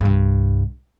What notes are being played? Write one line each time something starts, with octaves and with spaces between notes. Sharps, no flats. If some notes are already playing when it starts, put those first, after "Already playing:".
C2 G2